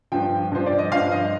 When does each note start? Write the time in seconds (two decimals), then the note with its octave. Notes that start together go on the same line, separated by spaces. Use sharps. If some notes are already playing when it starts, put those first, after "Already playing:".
0.12 G2 F3 G5
0.52 G2 F3 C5
0.66 D5
0.78 D#5
0.91 F3 F5
0.96 G2
1.12 D#5